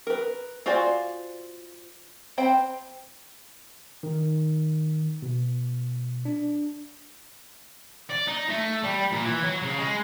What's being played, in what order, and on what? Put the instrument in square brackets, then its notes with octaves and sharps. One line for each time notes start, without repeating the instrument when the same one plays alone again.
[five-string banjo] A#4 B4
F4 F#4 C5 D5 G#5
C4 C5 G5 B5
[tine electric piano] D#3
B2
D4
[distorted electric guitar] D5
D#4
A3
G3
A#2
E3
F#3
C#3
G#3